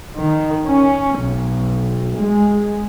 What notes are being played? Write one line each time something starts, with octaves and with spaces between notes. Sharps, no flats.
D#3
C#4
B1
G#3